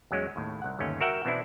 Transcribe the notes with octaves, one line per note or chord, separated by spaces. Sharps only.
E2 F#3 G#3 C#4
D#2 A2
C2 F#5
G1 D#2 A3 C#4
F#4 A#4 E5 F#5 G5
B2 E3 C4 D4 E4